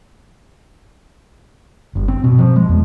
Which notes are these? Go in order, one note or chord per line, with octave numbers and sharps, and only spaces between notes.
G1
C4
B2
F3
G#3
E2